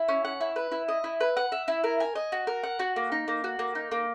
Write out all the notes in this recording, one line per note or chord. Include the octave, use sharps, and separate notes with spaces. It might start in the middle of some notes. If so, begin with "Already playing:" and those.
Already playing: E4
C#4
F#5
E4
B4
E4
D#5
E4
B4
F#5
E5
E4
A#4
G#5
D#5
F#4
A#4
F#5
F#4
A#3
D#4
A#3
F#4
A#3
D#4
A#3